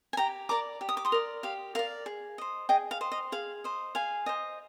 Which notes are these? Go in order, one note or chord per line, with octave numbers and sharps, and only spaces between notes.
G#5
G4 G5 A#5
A#4 D5 A#5 D6
G4
D#6
D6
C6 D#6
A#4 D5
G4 F5
A#4 D5 F5
G#4
C5 D#5
G#4 D#5 G5
F5
C5 D#5
D#5
G#4 F5
C5 D#5
G#4 F5 G#5
C5 D#5